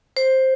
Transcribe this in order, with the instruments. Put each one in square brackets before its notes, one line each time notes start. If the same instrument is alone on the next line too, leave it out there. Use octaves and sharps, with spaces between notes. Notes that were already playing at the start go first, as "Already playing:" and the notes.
[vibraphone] C5